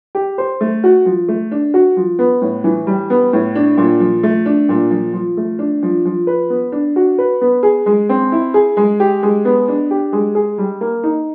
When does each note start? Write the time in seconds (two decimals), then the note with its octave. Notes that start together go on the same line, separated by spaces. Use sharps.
0.15 G4
0.38 C5
0.61 A3
0.84 F#4
1.06 F3
1.28 A3
1.51 D4
1.74 F#4
1.97 F3
2.19 B3
2.42 A2
2.64 E3
2.87 G3
3.10 B3
3.33 A2
3.55 D4
3.77 A#2
4.00 F3
4.23 A3
4.46 D4
4.69 A#2
4.91 F3
5.14 F3
5.37 A3
5.59 D4
5.83 F3
6.05 F3
6.27 B4
6.50 B3
6.72 D4
6.96 F#4
7.18 B4
7.41 B3
7.63 G#4
7.86 G#3
8.09 C4
8.32 E4
8.54 G#4
8.77 G#3
9.00 G4
9.23 G#3
9.45 B3
9.68 D4
9.91 G4
10.13 G#3
10.35 G#4
10.58 G3
10.81 A#3
11.04 D#4